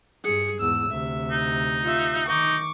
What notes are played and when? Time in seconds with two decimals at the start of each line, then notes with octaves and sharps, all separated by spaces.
0.24 G2 G#4 C#7
0.60 E2 G#2 E6
0.91 D2 C3 E5
1.31 D#4
1.84 F4 E5
2.28 D#3 D#4 C#6 D6